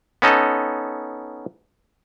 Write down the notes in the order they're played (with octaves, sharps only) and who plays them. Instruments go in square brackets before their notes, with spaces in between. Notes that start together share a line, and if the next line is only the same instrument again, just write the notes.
[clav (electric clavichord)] B3 C#4 D#4 A4